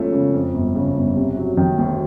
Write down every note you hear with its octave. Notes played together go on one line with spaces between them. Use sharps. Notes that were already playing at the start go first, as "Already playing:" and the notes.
Already playing: E1 F3 A3 C#4
C#3
F2
G1
C#3
G1
C3
F#3
D#3
D2